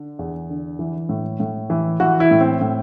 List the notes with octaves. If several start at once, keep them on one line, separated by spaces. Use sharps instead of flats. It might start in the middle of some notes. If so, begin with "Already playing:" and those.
Already playing: D3
E2
D3
E3
A2
A2
E3
E3 F#4
E4
A2
C4
A2